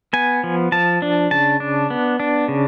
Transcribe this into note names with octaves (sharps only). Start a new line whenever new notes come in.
B3 G#5
F3
F3 A5
D4
C#3 A5
D4
B3
D4
C#3